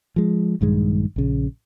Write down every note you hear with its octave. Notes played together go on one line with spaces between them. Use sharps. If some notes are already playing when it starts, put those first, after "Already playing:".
F3 G#3
A#1 G2 D#3 G#3
A#1 C#3